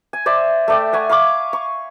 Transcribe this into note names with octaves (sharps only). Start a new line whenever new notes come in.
G#5
C5 D5 E5
A3 D5 G5
E5 F#5 G#5 C#6
F5 B5 C#6 D6
C#6